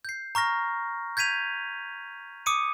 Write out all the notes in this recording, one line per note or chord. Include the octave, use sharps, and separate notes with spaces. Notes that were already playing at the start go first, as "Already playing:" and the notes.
G6 C7
A#5 C#6 F6 A#6
G6 G#6 B6 D#7 F7
D6 D#6 C#7 D#7